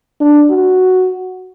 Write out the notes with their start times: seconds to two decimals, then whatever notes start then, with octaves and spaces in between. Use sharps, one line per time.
0.20 D4
0.50 F#4